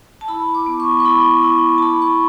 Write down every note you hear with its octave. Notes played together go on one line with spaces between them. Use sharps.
A5
E4 B5
D6
B3
C#6
C#6
E4 B5
E4
A5
E4 B5
C#6